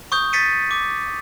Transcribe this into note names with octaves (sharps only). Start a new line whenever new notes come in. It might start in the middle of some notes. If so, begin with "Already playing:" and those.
C#6 D#6 G6
A6 B6 C#7 D#7
D6